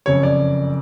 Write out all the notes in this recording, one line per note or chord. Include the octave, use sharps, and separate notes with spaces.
F#1 F2 C#3 C#5
D5